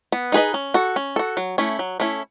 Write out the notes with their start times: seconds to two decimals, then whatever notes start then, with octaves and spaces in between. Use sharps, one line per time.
0.12 B3
0.32 D#4 G#4 B4 D#5
0.54 C#4
0.74 F#4 A4
0.96 C#4
1.16 F#4 A4
1.37 F#3
1.58 A3 C#4 E4
1.79 F#3
2.00 A3 C#4 E4